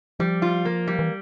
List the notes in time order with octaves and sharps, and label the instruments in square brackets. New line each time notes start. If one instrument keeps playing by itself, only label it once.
[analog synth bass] F3 [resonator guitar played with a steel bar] G3
[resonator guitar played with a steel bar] F4
A#3
G3
[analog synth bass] E3